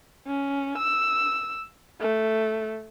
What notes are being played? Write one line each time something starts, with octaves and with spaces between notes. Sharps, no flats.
C#4
E6
A3